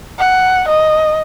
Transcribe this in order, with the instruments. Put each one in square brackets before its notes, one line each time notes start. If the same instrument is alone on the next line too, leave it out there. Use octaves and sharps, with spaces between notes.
[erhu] F#5
D#5